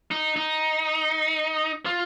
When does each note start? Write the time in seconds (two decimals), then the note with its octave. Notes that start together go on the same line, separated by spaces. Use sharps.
0.11 D#4
0.36 D#4
1.86 F4